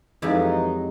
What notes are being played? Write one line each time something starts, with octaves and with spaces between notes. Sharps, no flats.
F2 E3 F#3 G#3 D#4 G4